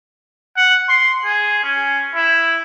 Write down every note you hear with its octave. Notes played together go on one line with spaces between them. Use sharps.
F#5
C6
G#4
C#4
E4